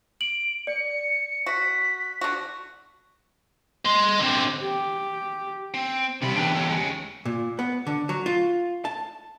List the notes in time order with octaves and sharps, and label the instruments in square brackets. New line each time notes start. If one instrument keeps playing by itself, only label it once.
[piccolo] D7 [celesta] F#7
[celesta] D5 [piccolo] C#7
[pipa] F#4 [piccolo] B6
[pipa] D3 F#4
[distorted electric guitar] D#5 C6
D3 C4
[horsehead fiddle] G4
[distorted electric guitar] C4
[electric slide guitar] C3 G3 [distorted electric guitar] D#3 B5
[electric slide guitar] E2 G4 [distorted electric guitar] D4 B4
[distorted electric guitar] A4 C#5
G#3 C#4
[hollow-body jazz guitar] A#2
B3
D3
F#3
F4
A5